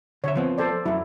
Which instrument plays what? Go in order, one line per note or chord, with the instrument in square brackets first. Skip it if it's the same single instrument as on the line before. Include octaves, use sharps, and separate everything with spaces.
[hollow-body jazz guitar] D3 E5 [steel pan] C#5
[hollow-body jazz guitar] F3 B3 C4
[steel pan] A4 C5 D5
[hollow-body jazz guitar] F#2 F#3 [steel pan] E4